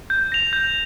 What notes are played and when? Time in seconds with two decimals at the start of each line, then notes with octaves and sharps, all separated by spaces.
0.10 G6
0.32 A#6 F7
0.53 G6